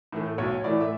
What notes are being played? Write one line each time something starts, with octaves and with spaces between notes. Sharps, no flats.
A2 E3 A3
B1 C#5
A2 E3 A3 D5
E5